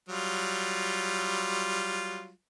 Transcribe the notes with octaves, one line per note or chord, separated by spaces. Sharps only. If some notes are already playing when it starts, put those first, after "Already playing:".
F#3 G3 F4